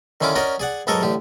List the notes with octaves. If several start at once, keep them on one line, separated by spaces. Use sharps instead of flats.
D3 D#3 C#4 E4 F4 D6
C#4 F#4 A#4 D5 D#5
G#4 D5 F#5
B1 G#2 A4 A#4 D#5 C#6
A1 D3 G4